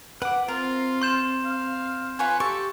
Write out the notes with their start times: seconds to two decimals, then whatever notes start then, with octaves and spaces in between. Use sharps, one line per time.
0.22 B4 F#5 D6
0.48 C4 F4 A#4
1.02 C6 G6 E7
1.45 F5
2.19 F4 B4 C#5 G#5
2.40 G4 A4 C#6